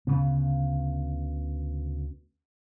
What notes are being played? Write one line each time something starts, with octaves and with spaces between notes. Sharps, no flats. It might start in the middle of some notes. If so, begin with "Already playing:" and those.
D2 C#3 B3